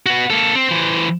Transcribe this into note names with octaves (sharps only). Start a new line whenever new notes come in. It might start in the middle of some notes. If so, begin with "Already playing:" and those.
B3 F#4
A#3 A4
C4
E3 C5